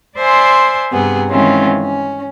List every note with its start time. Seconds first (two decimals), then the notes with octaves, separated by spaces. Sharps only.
0.17 C5 D5 E5 G#5 C6
0.91 G2 C3 B3 G#4
1.31 D#3 E3 G#3 C4 C#4 F4
1.80 C#4